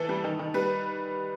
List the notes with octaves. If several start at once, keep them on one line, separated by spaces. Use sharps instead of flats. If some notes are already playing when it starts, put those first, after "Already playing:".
Already playing: E3 A4
G3
D#3
D#3
G3 B4